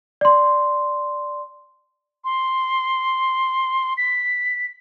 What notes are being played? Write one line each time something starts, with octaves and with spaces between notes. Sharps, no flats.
D5 C6
C6
B6